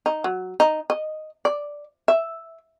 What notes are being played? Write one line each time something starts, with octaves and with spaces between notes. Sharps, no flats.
D#4
F#3
D#4
D#5
D5
E5